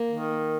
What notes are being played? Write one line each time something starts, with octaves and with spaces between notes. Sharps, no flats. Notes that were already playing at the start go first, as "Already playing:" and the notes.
Already playing: A#3
D#3